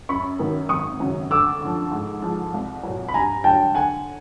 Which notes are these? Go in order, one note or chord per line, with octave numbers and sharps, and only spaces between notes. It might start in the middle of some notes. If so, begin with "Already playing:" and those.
F#2 B5 C#6
D#3 F#3 A#3
G#1 C#6 D#6
F#2 C#3 F#3
D2 D6 E6
D3 F3
G#2
F3 G#3
C2
A#2 F#3
B5
G2 G#5 A#5
D3 F#3 G5 A5
D3 F#5 G#5